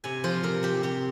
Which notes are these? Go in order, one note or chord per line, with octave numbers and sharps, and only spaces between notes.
C3 G#5
F3 C5
C3 A#4
C4 G4
C3 G4